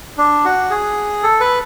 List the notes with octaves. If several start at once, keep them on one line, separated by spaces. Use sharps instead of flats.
D4
F#4
G#4
A4
B4